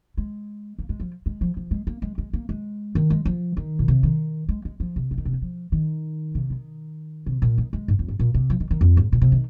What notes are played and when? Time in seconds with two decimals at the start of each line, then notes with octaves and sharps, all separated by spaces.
0.17 G#3
0.79 A#3
0.89 G#3
1.00 F3
1.26 G#3
1.41 F3
1.57 F3
1.71 G#3
1.87 A#3
2.02 G#3
2.18 G#3
2.33 A#3
2.49 G#3
2.95 D#3
3.10 G#3
3.25 F3
3.57 D#3
3.79 A#2
3.88 C3
4.03 D#3
4.49 G#3
4.65 G#3
4.80 F3
4.96 C3
5.11 F3
5.18 D#3
5.25 C3
5.33 D#3
5.42 F3
5.72 D#3
6.35 C3
6.50 D#3
7.26 C3
7.42 A#2
7.58 D#3
7.73 G#3
7.88 G#2
7.99 F2
8.08 G#2
8.19 A#2
8.34 C3
8.50 F3
8.60 D#3
8.71 D#3
8.81 F2
8.97 G#2
9.12 A#2
9.22 C3
9.32 D#3